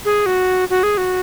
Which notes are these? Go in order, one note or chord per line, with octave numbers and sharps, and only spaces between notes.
G#4
F#4
F#4
G#4
F#4